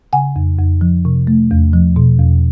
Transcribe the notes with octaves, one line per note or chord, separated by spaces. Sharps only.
C#3 F#5 G#5
F2
F2
F3
C3
A3
E2
F3
B2
E2